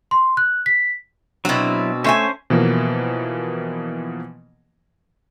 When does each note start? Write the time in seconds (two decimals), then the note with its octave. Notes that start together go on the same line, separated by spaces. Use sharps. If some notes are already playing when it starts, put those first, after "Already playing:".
0.11 C6
0.37 F#6
0.66 B6
1.45 B2 F#3 C4 D4 E4
2.04 A3 C#4 C5 E5 G#5
2.50 B2 E3 F3 A#3